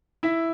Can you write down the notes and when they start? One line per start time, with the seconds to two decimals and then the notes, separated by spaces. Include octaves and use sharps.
0.23 E4 E5